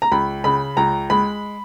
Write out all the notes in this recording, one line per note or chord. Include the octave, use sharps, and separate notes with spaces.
A#5
C#2 B5
C#3 B5
C#2 A#5
G#3 B5